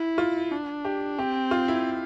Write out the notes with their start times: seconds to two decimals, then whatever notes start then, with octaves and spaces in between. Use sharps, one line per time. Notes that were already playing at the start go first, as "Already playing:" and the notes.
Already playing: E4
0.18 F4
0.52 D4
0.85 G4
1.19 C4 G4
1.51 F4
1.68 E4